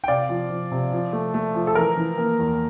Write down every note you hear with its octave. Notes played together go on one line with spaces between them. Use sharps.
G5
C3 D5 F5
F3
F3
C3
F3
A3
A3
F3
A4
E3 A#4
E3
A#3
E2